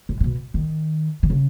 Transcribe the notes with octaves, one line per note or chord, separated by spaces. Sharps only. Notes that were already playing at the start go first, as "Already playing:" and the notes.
A2
A2
B2
D#3
D#3
C#3